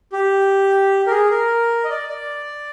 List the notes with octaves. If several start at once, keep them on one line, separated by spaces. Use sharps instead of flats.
G4
A#4
G#4
A#4
D#5
D5
D5